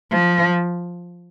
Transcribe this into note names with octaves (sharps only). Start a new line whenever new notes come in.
F3